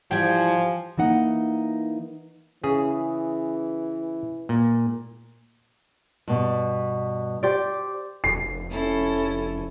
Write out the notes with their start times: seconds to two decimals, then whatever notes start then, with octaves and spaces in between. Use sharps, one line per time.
0.11 G#2 E3 F3 G3 G5 G#5
0.97 E3 A#3 D#4 F#5
2.64 C#3 E3 G#4
4.49 A#2
6.28 G2 B2 G3
7.43 G4 C5 D5
8.24 F1 C7
8.70 C#4 E4 A4